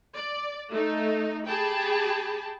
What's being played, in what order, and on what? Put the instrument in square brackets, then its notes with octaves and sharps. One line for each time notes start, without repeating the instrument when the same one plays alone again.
[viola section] D5
A3 D#4
G4 G#4 G5 A5 B5